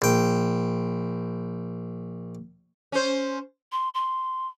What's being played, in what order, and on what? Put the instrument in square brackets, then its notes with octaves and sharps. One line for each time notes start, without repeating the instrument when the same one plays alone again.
[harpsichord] A#1 G5
[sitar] C#4 C5
[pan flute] C6
C6